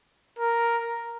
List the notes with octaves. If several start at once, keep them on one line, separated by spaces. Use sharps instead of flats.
A#4